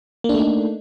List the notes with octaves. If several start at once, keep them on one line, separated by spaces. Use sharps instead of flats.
A3 A#3 D4 D#4